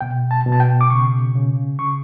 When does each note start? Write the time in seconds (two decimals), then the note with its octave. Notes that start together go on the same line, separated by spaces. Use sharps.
0.01 B2 G5
0.31 A5
0.46 B2
0.52 A5
0.60 G5
0.81 D6
0.90 C#3 C#6
1.35 C#3
1.79 C#3 C#6